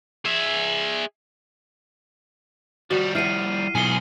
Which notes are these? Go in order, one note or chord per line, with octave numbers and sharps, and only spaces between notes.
G#4 E5
F3 G3 F#4
E4 F#5 F6 C7 D#7
B1 G#4 G#5 C7 C#7 G7